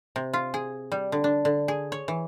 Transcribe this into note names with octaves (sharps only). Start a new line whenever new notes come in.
C3
F4
G#4
G3
D3
D4
D3
G#4
C#5
E3